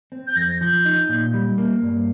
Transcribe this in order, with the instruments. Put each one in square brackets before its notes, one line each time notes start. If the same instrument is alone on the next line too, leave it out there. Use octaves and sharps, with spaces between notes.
[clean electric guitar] C4
[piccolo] G6
[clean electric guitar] F2 [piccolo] A#6
[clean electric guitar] F3 [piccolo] G6
[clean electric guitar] D#4
A#2
G3
A#3
G2